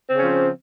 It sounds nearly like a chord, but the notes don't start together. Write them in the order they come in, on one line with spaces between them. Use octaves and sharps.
C4 C#3 C#4 F3